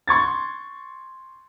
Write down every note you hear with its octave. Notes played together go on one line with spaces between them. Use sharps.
C6 C#6 G#6 A6